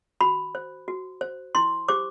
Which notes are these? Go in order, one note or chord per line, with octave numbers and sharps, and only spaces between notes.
F#4 B5
C5
F#4
C5
E4 C6
G4 C5 D6